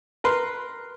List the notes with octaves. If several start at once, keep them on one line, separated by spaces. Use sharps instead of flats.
A#4 B4 C6